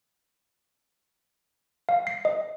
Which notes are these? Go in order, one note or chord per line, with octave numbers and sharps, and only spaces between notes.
F5
C7
D#5